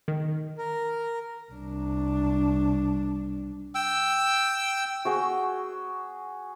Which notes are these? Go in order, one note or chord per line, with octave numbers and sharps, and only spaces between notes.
D#3
A#4
C2 D4
G5 E6
F#4 G#4 C#6